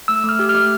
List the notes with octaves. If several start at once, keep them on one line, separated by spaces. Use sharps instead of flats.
A3 E6
A3
F6
G4
F6
A3